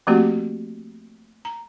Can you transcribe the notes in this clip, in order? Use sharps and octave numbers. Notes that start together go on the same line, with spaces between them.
F3 A3 A#3 C4 F#4 G4
A#5